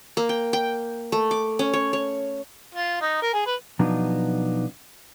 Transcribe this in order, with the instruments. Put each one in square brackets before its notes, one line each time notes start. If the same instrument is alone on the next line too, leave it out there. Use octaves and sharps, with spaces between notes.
[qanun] A#3
G5
G5
A3
D6
C#4
C#5
C#5
[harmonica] F4
D#4
A#4
G#4
B4
[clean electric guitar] B2 F3 F#3 B3 D4 D#4